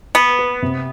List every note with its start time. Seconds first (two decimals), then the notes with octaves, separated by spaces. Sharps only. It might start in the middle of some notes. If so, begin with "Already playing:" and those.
0.15 B3 B4
0.39 B4
0.62 C3